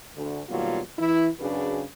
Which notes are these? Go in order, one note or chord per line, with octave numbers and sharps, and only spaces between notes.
D2
B2 D#3 F#3 G3 A#3 F4
E3 E4
F#2 C#3 D4 F#4 G#4 B4